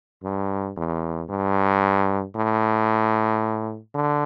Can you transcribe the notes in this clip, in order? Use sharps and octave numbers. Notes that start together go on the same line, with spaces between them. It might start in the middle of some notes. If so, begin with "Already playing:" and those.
G2
E2
G2
A2
D3